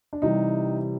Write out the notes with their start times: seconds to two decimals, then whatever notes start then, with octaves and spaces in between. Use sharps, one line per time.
0.13 D4
0.22 C3 E3 G3 D#4